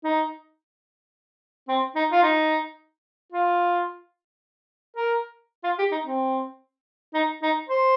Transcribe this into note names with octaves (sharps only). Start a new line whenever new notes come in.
D#4
C4
D#4
F4
D#4
F4
A#4
F4
G4
D#4
C4
D#4
D#4
C5